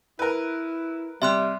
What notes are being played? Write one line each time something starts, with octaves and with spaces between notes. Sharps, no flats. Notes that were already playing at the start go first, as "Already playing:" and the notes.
E4 A#4 B4
C3 G3 E5 C6 F#6